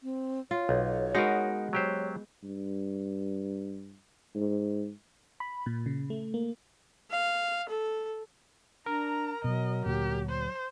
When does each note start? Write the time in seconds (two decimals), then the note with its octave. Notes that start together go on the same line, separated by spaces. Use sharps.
0.03 C4
0.51 F4 C#5
0.69 B1
1.15 G#3 B3 D#4 F#4 A#4
1.73 F#3 G4 C5 C#5
2.43 G2
4.36 G#2
5.40 B5
5.66 A#2
5.86 C#3
6.10 A3
6.34 A#3
7.11 F5
7.68 A4
8.86 D4 A#4 A#5
9.44 B2 F#3 D#5
9.86 D2 A#2 G4
10.29 C5